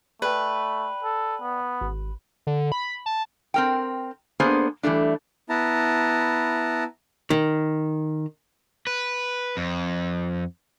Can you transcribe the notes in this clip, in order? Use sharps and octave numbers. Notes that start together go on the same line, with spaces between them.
A3 B4 D5 G5
A4
B3
G#1
D3
B5
A5
C4 A#4 G5
A#3 B3 D4 G#4 A4 C5
E3 G3 A3 D4
B3 E4 A5 A#5
D#3
B4
F2